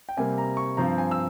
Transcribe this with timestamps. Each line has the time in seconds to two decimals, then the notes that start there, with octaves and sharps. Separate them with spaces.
0.09 G5
0.17 C3 G3 A#3 G#5
0.38 A#5
0.57 C#6
0.77 G2 F3 C4 A#5
0.98 G#5
1.11 E6